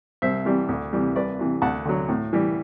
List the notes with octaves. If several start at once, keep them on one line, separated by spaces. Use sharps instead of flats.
C2 C5 E5
C3 E3 G3
D2
C3 E3 G3
C2 B4 D5
C3 E3
D2 F#5 A5
D3 F#3
A2
E3 G3